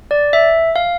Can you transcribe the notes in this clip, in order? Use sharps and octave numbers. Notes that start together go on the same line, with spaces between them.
D5
E5
F5